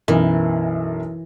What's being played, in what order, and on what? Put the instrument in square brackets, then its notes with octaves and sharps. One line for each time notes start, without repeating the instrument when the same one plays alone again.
[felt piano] B1 F#2 A#4 [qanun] E3